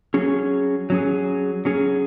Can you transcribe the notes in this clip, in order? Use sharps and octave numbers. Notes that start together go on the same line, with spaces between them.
F#3 C#4 G#4
F#3 C#4 G#4
F#3 C#4 G#4